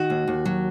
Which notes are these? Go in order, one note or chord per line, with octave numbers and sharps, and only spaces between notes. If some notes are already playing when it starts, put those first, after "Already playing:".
Already playing: D#3 F#4
D#2
D#2
F#3